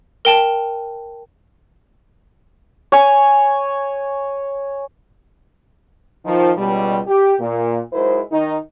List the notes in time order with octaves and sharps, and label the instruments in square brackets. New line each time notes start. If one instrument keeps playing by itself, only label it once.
[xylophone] A#4 G5 A5
[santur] C#5 G#5
[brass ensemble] D#3 F3
C#2 B2 G3
G4
A#2
F#3 G#3 D#4 E4 A#4 C5
D#3 D#4